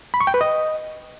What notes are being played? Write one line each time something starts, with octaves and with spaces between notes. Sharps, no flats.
B5
C#6
G5
B4
D#5